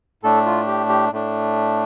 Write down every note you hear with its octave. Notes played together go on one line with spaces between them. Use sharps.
A2 A3 D4 A4
F4
G4
G4
A2 A3 D4